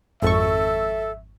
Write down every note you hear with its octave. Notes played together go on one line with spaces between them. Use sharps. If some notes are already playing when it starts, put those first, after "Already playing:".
G#1 F2 A4 E5 C#6